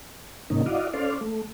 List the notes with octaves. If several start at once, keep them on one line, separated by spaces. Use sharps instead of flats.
G#2 C3 D#3 A#3 C#4 D#4
E4 F#4 D5 D#5 F5
C#4 A4 C5 D5 F5
A3